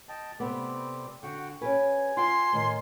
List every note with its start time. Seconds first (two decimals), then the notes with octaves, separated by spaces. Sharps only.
0.09 D#5 G5 A5
0.40 C3 G3 A3 B3 C4 D6
1.23 D3 F#4 F#5 G5
1.61 C#4 G4 B4 G#5
2.17 F4 F5 G5 C6
2.53 A2 D#3